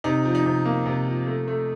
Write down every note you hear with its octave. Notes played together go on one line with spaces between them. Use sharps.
C3 D#4
F3
D#4
C3
A#3
C3
F3
A3
A3